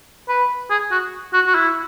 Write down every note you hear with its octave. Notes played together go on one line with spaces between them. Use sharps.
B4
G#4
F#4
F#4
F#4
E4